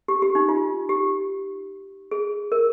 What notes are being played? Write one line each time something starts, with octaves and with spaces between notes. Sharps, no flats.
G4
G4
D#4
F4
G4
G#4
A#4